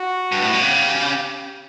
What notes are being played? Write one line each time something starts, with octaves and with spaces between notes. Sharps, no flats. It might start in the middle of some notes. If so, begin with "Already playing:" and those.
Already playing: F#4
G2
A2
B2
C#3 G4